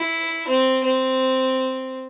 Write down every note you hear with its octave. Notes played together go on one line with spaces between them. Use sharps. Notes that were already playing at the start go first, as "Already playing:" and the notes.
Already playing: E4
C4
C4